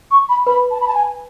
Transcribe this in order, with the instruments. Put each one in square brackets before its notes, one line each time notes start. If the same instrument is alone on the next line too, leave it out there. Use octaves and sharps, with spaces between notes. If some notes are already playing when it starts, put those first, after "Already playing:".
[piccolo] C#6
B5
[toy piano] B4 [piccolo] B5
[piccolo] A5
B5
A5
G#5